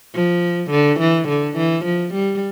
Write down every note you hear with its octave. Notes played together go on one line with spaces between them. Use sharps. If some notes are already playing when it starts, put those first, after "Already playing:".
F3
D3
E3
D3
E3
F3
G3